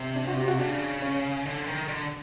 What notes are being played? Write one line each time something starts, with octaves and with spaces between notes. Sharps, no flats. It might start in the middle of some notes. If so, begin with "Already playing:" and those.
Already playing: C3
D4
F#4
G4
F#4
C#3 D4
C#4
D3
D#3
D3